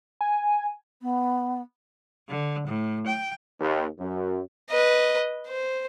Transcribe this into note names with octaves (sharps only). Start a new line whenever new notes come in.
G#5
B3
D3
A2
G5
D#2
F#2
B4 D#5
C5